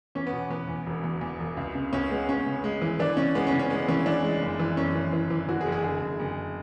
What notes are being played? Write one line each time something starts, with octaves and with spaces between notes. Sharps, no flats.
E2 C#4
B3
B2
E2 B3
E2
E1
E2
E2
E1
C#2
C#3
C#2 C#4
G#3 B3
C#2 C#4
C#3
G#3
E3
E3 D4
C#3 C#4
G#3 B3
C#4
C#3
C#4
G#3 B3
E3 C#4
E3 D4
G#3
F#1
E3
F#2 C#4
E3
E3
E3
E3 F#4
G#4
F#1
G#4
D3 G#4
F#1
F#1